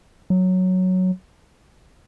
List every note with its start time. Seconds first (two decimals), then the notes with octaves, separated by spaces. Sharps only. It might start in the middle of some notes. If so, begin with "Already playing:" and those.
0.30 F#3